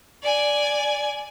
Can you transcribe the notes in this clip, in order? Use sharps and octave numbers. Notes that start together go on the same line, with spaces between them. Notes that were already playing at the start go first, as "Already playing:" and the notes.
D5 G#5